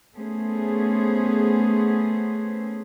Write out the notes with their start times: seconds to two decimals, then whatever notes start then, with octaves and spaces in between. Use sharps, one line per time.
0.16 A3 B3 C#4 G#4 C5